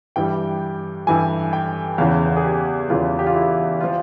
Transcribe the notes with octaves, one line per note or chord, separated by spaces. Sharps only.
G2 E3 G3 G5
G2 E3 G3 G#5
G5
E2 C#3 E3 F5
G#4
G4
E2 C#3 E3 F4
G4
F4
E4
F3 F4